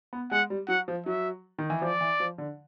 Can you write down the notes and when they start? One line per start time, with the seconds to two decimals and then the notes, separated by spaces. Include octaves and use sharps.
0.13 B3
0.31 G#3 F#5
0.50 G3
0.68 F#3 F#5
0.88 F3
1.06 F#3 E5
1.58 D#3
1.70 E3
1.81 F3 D5
2.01 E3
2.20 F3
2.38 D3